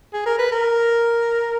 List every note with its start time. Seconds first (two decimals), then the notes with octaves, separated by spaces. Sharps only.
0.13 G#4
0.25 A#4
0.38 B4
0.51 A#4